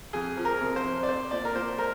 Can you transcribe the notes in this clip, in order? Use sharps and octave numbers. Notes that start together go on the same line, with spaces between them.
F2 G#4
F3
A#4
C3
C5
F2
D5
C4 C5
A#2 D5
A#4
A#2 C5
G#3 A#4